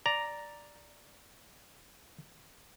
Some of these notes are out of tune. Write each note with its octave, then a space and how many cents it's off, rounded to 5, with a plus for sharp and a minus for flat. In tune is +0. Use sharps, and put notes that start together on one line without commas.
D5 +0 A#5 +0